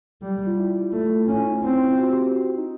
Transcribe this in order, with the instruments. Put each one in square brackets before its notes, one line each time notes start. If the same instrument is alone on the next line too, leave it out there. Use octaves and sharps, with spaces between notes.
[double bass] G3 [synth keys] G4
[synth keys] F4
E4
F4
[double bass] A3
[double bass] C#4 [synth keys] E4
[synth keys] D#4
[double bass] C4 [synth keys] E4
[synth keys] E4
F4
F#4
G4
G4
F#4
F#4
D#4